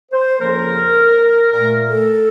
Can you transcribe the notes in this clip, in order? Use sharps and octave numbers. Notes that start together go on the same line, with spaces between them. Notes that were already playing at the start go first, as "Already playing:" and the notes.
C5
F2 C#3 F3 A#3 A#4
A#2 A3 A#4
A4